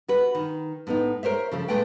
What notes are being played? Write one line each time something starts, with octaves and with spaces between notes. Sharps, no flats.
F#4 B4
D#3
A2 B3 D#4
A#4 C5 C#5 E5
C#3 F3 A4
A#2 D#3 G#3 A3 B4 G5